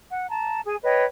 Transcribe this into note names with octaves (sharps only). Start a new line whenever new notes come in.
F#5
A5 A#5
G#4 G#5
B4 C#5 D#5 G5